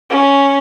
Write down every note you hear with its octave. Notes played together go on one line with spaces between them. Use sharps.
C#4